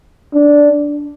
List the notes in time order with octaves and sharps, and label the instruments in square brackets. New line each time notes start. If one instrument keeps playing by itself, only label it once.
[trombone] D4